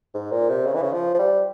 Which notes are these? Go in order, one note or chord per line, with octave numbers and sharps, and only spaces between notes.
G#2
A#2
C3
C#3
E3
C#3
F3
F3
G3